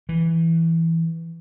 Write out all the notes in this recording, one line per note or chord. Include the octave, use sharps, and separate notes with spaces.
E3